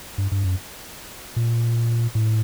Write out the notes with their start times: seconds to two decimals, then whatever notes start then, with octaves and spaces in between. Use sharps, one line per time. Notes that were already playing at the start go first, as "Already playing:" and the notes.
0.18 G2
0.32 G2
0.44 F#2
1.36 A#2
2.15 A2